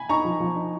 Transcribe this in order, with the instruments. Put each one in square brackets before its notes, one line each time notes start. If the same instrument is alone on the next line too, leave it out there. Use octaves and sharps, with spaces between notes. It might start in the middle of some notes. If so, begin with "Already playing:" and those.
Already playing: [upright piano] G#5 B5
[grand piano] D#4 [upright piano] A#5 C#6
[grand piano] F3
F3
D#4